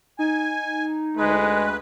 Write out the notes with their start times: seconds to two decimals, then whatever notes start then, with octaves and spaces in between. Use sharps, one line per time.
0.19 D#4 G#5
1.17 D2 G#3 B4